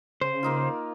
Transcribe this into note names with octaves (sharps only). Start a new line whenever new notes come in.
C#3 C5
A#3 D#4 F4